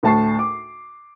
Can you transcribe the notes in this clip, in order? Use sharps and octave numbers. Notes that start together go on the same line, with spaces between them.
D2 A2 A5 C#6 C7
D6